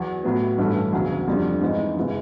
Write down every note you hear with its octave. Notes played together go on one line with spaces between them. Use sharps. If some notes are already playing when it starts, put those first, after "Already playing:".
Already playing: E2 F#3
A2 F#3 B3
A1 G2 E3 A3 C#4
E1 D2 C#3 F#3
F2 D3 G3 C4
G#2 E3 G#3 C4 D#4
F#1 C#3 E3 G#3